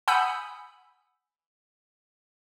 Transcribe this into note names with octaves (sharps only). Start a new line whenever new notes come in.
F#5 G#5 B5 D#6 E6 G6